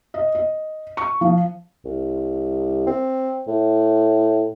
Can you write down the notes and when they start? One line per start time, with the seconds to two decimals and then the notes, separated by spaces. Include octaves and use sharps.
0.14 D#5
0.35 D#5
0.97 C#6
1.21 F3
1.85 C2
2.87 C4
3.48 A2